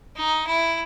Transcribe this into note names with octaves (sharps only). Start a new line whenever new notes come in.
D#4
E4